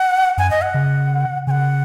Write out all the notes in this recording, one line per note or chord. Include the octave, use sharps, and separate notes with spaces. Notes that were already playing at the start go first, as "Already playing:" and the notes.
Already playing: F#5
F#2 G#5
D#5
F#5
C#3
C#3 F#5 G#5